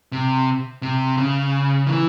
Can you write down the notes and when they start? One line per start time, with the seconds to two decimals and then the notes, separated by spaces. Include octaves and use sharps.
0.12 C3
0.82 C3
1.17 C#3
1.87 E3